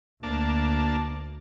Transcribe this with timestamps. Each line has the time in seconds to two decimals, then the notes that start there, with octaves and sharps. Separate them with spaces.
0.23 D2 A#3 D4 A5